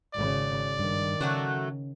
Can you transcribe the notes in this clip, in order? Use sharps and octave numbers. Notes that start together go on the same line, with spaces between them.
G#1 C#3 D5
G2 D#3
C#3 F#3 A3 F#4